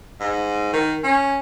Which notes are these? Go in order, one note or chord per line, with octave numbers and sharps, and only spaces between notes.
G#2
D#3
C#4